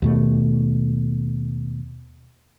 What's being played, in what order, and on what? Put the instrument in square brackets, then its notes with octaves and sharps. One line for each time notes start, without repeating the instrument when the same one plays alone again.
[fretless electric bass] D#2 B2 A3